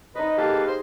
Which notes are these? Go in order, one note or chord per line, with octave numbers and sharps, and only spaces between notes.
D#4 B4 C5 D#5
A#3 G4 A4 B4 F5
G#4
C5